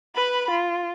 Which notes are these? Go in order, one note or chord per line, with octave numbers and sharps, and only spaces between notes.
B4 B5
F4